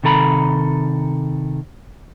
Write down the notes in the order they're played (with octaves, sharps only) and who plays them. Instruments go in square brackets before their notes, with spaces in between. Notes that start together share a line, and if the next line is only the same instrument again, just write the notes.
[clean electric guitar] C3 D#3 A4 A#5 B5